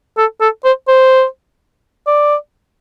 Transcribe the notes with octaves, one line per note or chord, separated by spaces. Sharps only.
A4
A4
C5
C5
D5